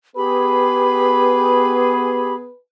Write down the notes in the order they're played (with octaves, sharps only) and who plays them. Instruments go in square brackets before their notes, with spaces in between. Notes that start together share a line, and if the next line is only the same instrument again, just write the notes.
[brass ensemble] B3 G#4 [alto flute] G4 [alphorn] B4 [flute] B5